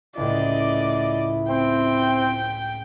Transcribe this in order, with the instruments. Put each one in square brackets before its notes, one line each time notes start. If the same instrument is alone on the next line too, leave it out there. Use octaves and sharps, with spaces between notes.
[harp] C#2 A2 [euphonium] E4 [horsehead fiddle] D5 D#5
[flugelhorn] C4 [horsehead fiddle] G5